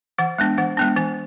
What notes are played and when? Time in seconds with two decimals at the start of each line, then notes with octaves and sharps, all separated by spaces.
0.18 E3 F#5
0.38 G#3 B3 D4
0.58 E3 F#5
0.77 G#3 B3 D4
0.97 E3 G#5